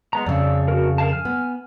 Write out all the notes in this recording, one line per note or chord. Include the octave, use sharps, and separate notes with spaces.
G#3 B3 A#5
F2 C#3 D5 E6
F#4 A#4
A#4 F5 A5
G#5 F6
B3